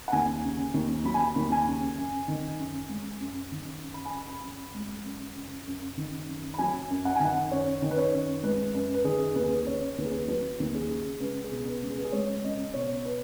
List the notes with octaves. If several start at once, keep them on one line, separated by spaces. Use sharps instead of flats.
F#5
D#2 G#5
C#3
D#2
F#3 B5
G#5
B5
D#2
G#5
C#3
F#2
D#3
F#2
G#3
F#2
D#3
F#2
B5
G#5
C#3 B5
B5
F#2
G#3
F#2
C#3
F#2
D#3
F#2
B5
F#3 G#5
F#2
F#5
D#3 G#5
F#5
F#2 C#5
D#3
B4
C#5
F#2
G#3 B4
F#2 B4
B4
D#3 G#4
D#2 B4
G#4
B4
C#3 C#5
D#2 B4
G#4
B4
F#3 B4
D#2
G#4
C#3
C#2 B4
G#4
B2
B4
C#2
G#4
B4
G#4
G#3 C#5
C#2 D#5
B2 C#5
B4